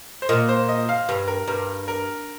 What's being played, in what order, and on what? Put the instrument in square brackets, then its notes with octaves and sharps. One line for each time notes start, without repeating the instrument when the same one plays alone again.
[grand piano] C5
[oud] A#2 [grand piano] D#5
[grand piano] C5
D#5
F5
[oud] G2
[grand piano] A#4
[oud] G2 [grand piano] A#4
[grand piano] A#4